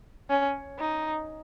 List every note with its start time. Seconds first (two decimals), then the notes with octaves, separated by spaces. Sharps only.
0.30 C#4
0.79 D#4